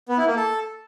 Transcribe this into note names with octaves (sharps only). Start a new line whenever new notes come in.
B3
E4
A#3
A4